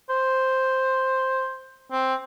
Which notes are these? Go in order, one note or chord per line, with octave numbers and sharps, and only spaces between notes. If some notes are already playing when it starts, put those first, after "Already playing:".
C5
C4